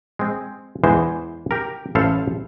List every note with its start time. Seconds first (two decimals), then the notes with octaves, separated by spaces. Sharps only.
0.19 G#3 C4
0.84 E2 E3 G#3 C5
1.51 G4 A#4
1.95 A1 E4 A4 C5 F5